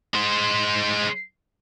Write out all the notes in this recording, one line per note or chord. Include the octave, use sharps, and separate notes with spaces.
G#3 C5